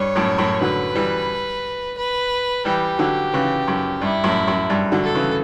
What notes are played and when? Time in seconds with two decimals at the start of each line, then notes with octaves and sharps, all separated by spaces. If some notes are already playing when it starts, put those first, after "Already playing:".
Already playing: G2 C#5
0.15 F#2 A2
0.38 F#2 A2
0.61 D3 F#3 B4
0.95 E3 G3
1.97 B4
2.65 E3 G3 G4
2.99 D3 F#3
3.33 C#3 E3
3.68 F#2
4.02 G2 E4
4.24 F#2 A2
4.47 F#2
4.70 G2
4.92 D3 F#3
5.03 A4
5.15 C#3 E3